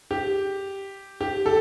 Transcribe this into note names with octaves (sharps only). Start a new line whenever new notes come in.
G4
G4
A4